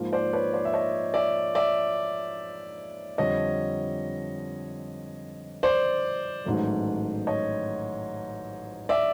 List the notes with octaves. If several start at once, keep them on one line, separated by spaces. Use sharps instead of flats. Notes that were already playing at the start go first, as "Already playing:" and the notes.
Already playing: G#2 F3 A#3
C5 D5
B4 C#5
C5 D5
E5
C#5 D#5
D5 E5
D5 E5
F2 D3 G3 C#5 D#5
C5 D5
A1 G#2 D#3 F#3 A3
C#5 D#5
D5 E5